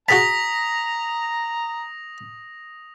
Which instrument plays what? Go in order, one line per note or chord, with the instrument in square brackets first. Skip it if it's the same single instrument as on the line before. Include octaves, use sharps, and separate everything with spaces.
[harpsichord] F#4 G#4 A5 [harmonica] A#5 [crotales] D#6 A#6 F7 [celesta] B6